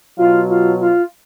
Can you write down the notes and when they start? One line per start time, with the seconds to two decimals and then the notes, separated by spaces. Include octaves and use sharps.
0.17 B2 F#3 F4
0.49 F4
0.81 F4